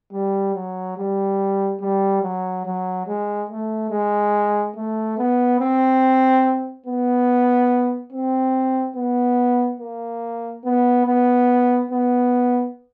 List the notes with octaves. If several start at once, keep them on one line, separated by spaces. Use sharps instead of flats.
G3
F#3
G3
G3
F#3
F#3
G#3
A3
G#3
A3
B3
C4
B3
C4
B3
A#3
B3
B3
B3